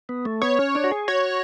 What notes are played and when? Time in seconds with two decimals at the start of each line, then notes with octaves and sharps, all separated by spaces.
0.09 B3
0.25 A3
0.42 B3 C#5
0.59 C#4
0.75 D4
0.84 F#4
0.91 G#4
1.08 F#4 C#5